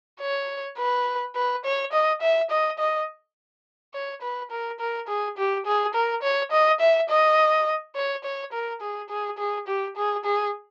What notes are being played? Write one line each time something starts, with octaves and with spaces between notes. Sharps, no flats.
C#5
B4
B4
C#5
D#5
E5
D#5
D#5
C#5
B4
A#4
A#4
G#4
G4
G#4
A#4
C#5
D#5
E5
D#5
C#5
C#5
A#4
G#4
G#4
G#4
G4
G#4
G#4